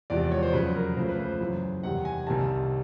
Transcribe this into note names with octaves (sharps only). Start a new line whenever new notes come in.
E2 C3 F3 G#3 D5
C#5
C5
F2 C#3 F#3 B4
A#4
C#2 C#3 F3 A3 C5
B4
C5
F#2 C#3 E3
E2 C3 D#3 G3 F#5
G#5
C2 C3 D#3 G3 A5